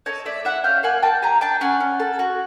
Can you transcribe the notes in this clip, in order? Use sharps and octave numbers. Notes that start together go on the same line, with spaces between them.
A4 C#5 D#5
A3 D5 E5
E4 E5 F#5
C#4 F5 G5
A#3 F#5 G#5
A#3 G5 A5
G4 G#5 A#5
D4 G5 A5
C#4 F#5 G#5
C#4
A4
F#4